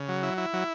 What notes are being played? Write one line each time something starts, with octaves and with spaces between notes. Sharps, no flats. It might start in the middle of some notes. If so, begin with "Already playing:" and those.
Already playing: C#3
F#3
E4
E4
F#3